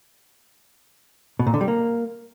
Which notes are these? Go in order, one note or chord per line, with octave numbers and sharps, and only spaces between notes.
B2
A#2
D3
G3
A#3